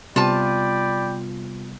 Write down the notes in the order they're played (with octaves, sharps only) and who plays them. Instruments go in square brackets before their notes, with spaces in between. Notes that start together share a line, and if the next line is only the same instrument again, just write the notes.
[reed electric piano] C3 G3 B3 [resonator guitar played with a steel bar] F4 A5 [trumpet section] D5 G5 B5